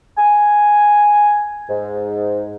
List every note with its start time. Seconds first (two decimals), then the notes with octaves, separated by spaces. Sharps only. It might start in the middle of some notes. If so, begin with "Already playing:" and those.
0.18 G#5
1.69 G#2